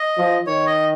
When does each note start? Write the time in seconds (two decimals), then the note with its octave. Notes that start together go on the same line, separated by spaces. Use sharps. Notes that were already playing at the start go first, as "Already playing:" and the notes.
Already playing: D#5
0.17 F3
0.47 D#3 C#5
0.67 D#5